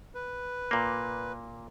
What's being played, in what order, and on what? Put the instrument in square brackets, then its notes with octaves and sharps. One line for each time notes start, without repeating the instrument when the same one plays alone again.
[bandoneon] B4
[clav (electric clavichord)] A#2 A#3